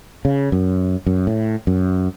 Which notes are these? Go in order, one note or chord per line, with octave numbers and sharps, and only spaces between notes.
C#3
F#2
F#2
A2
F#2